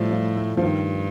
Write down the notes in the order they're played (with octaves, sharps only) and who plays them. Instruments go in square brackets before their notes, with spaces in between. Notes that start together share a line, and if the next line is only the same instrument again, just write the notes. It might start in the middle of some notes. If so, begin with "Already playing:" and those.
Already playing: [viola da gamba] A2 [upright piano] F3 G3 A3
[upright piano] F3
A3
F3
[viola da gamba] G2 [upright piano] D#3